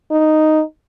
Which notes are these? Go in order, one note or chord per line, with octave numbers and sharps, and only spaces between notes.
D#4